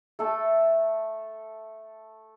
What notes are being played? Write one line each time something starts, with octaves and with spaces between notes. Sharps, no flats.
A3 A4 A5